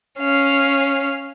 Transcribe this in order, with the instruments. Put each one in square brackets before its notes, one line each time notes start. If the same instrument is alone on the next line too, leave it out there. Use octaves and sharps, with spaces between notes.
[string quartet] C#4 F5